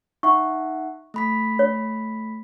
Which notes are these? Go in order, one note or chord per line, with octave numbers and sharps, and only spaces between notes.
D#4 E5 F#5 C#6
A3 B5 B6
C#5